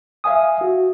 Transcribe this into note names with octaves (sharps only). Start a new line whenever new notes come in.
E5 F5 G#5 D#6
F#4